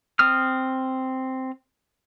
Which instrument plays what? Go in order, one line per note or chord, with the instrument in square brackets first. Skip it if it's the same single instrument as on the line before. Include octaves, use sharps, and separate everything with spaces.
[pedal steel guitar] C4 D#6 F6